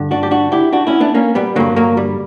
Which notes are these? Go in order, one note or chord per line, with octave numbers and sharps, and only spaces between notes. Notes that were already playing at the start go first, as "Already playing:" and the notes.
Already playing: G2 D3
D4 F#4
G4
D4 F#4
E4 G4
D4 F#4
C#4 E4
B3 D4
A#3 C#4
G3 B3
G2 D3 F#3 A#3
F#3 A#3
G3